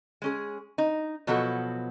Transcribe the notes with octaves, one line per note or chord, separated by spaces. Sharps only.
G#3 C#4 G#4
D#4
B2 F3 F#3 B3 F#4 A4